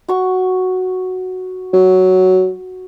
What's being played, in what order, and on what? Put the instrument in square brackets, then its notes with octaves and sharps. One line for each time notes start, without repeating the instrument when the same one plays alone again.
[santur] F#4 C#6
[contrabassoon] F#3